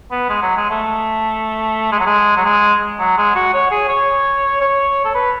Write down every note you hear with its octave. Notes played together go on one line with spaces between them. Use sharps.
B3
G#3
F#3
G#3
A3
G#3
F#3
G#3
F#3
G#3
F#3
G#3
F#4
C#5
G#4
C#5
C#5
A4
B4